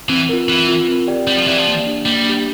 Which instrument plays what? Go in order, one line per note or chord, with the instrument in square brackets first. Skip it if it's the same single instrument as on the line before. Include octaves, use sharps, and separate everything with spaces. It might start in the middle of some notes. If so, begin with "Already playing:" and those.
[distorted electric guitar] E3 [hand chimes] C4
[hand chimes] F4 A#4
[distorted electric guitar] E3 [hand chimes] C4
[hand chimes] F4 A#4
C4
G4 D5 G5
[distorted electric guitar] G3 [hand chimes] C4
[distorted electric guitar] F3
[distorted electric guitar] E3 [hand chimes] G4 D5 G5
[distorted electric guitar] F3
[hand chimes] A#3
D4 G4
[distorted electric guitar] G3 [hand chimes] A#3
[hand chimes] D4 G4